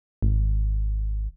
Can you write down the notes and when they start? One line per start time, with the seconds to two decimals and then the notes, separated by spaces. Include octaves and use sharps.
0.22 G#1